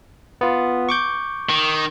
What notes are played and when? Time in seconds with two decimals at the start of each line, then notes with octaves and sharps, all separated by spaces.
0.41 B3 F4
0.89 C#6 D6 G6
1.50 D#3